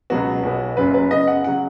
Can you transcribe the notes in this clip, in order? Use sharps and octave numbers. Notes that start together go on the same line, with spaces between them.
C#2 B2 F#3 B3 F#4
B1 B2 B3
F#1 F#2 C#3 F#3 B4
B4
F#2 C#3 B3 D#5
F#5
C#3 F#3 F#5